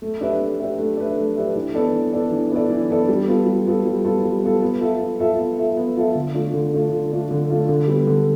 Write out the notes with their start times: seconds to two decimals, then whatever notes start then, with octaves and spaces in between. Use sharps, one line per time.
0.02 A3
0.21 D4 G4 B4 E5
0.41 A3
0.59 D4 G4 B4 E5
0.78 A3
0.97 D4 G4 B4 E5
1.17 A3
1.36 D4 G4 B4 E5
1.55 E3
1.74 B3 D4 A4 D5
1.93 E3
2.12 B3 D4 A4 D5
2.32 E3
2.52 B3 D4 A4 D5
2.70 E3
2.90 B3 D4 A4 D5
3.09 G3
3.27 B3 F4 A4
3.47 G3
3.67 B3 F4 A4
3.85 G3
4.05 B3 F4 A4
4.24 G3
4.43 B3 F4 A4
4.62 B3
4.81 F4 A4 E5
5.00 B3
5.20 F4 A4 E5
5.38 B3
5.58 F4 A4 E5
5.77 B3
5.97 F4 A4 E5
6.15 D3
6.34 A3 D4 F4
6.54 D3
6.73 A3 D4 F4
6.92 D3
7.12 A3 D4 F4
7.31 D3
7.50 A3 D4 F4
7.69 D3
7.87 G3 B3
8.07 D3